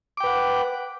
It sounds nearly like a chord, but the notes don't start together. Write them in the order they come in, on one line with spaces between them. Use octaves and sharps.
D6 G5 B4 F#5